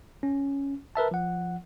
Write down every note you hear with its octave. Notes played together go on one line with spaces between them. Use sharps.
C#4
A#4 B4 E5 A5
F3 F#5